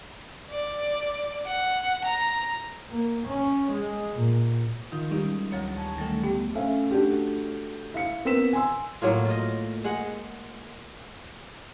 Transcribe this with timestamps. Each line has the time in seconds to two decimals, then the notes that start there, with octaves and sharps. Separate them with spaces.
0.50 D5
1.47 F#5
2.05 A#5
2.89 A#3
3.26 C#4
3.72 G#3
4.14 A#2
4.92 D#3 D#4 F4 G6
5.11 G3 G#3 C#4 D#4 E4
5.52 D2 F#3 C#5 A#5
5.77 C#4 A5
5.98 D3 D#3 F#3 G3 A3
6.23 A3 B3 G4
6.55 A3 C#4 E5 F5
6.91 A3 D4 F#4 G4
7.94 E4 F5 C#7
8.25 B3 C4 A#4 E6 B6 E7
8.53 G#5 C6 E6
9.02 A2 F#3 A#3 F4
9.25 F4 D#5
9.84 G#3 F#5